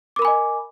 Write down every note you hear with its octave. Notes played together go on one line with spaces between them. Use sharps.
A#4 D#5 G#5 B5 D6